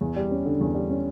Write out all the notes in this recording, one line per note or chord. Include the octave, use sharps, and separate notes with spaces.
E2
G3
C#4
D3
E2
G3
C#4